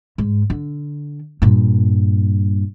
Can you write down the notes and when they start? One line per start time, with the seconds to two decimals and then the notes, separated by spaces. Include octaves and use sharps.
0.18 G#2
0.50 D3
1.42 G2 A#2